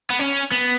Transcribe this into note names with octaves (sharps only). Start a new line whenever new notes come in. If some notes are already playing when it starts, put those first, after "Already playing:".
B3
C#4
B3